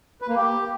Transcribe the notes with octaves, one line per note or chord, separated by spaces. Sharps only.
B4
A#3
G4